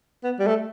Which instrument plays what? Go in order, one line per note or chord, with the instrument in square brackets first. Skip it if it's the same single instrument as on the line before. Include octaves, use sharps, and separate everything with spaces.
[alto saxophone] B3
G3
A3